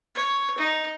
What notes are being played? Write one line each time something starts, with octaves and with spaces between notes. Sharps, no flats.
C#5
D#4